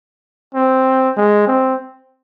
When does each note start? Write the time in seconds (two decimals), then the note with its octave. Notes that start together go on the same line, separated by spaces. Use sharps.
0.55 C4
1.17 G#3
1.47 C4